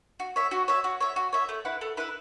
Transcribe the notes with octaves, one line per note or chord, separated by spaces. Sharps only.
F#4
C#5 E5
F#4
C#5 E5
F#4
C#5 E5
F#4
C#5 E5
A3
E4 B4 F#5
A3
E4 B4 F#5